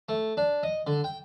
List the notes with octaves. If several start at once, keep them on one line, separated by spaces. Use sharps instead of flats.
A3
D4
D#5
D3
G5